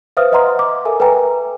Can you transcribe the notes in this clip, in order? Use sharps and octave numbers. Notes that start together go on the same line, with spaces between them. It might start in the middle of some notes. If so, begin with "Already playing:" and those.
B4 C5 E5 F5 D#6 F6
B4 D#5 E5 F#5 A#5 C6
D6
A4 A#4 E5 G#5
A4 B4 E5 G5 G#5 A#5